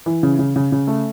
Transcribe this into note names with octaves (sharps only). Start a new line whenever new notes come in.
E3
C#3
C#3
C#3
C#3
A3